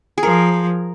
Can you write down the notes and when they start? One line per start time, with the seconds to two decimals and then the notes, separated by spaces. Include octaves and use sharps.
0.18 G#4
0.23 F3 A#4